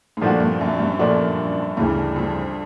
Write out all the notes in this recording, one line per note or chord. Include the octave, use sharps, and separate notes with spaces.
G#2
G2 A#2 F3 A3 D4 F#4
G2
F#2
G2
A#2 F3 A3 D4 F#4
D2 G2 C#3 E3 G3
F2